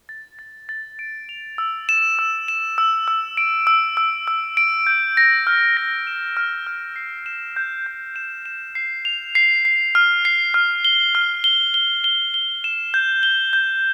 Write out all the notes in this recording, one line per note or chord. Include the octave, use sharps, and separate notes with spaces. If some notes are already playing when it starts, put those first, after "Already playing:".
A6
A6
A6
D7
F7
E6
E7
E6
E7
E6
E6
D7
E6
E6
E6
D7
G6
A#6
F6
A#6
E7
F6
F6
C7
E7
G6
G6
E7
E7
C7
F7
C7
C7
F6
C7
F6
G7
F6
G7
G7
G7
G7
E7
G6
G7
G6